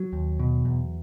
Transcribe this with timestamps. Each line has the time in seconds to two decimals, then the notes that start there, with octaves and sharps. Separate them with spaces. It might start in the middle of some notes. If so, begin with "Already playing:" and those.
Already playing: F#3
0.13 D#2
0.39 B2
0.65 E2